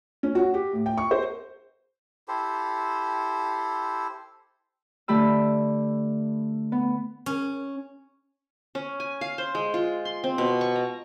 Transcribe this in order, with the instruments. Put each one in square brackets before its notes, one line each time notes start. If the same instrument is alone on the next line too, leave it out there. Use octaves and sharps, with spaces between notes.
[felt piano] C#4
F#4
G4
A2
G5
C#6
C5
[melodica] E4 G4 A4 C5
[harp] D3 A3 G4 B5 E6
B3
[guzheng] C#4
[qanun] C#4
G#5
F5
C5
G#3
F4
C6
C4
B2
C#6
A#5